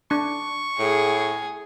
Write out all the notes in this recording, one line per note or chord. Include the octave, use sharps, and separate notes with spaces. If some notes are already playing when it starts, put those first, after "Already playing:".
D4 C#6
A2 G#4